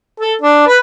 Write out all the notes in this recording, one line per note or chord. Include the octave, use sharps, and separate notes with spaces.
A4
D4
B4